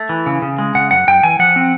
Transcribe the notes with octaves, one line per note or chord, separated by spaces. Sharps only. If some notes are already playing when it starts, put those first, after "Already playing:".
Already playing: A3
E3
C#3
C#3
G#3
C#3 F#5
F#2 F#5
F#2 G5
E3 G#5
F3 F#5
C4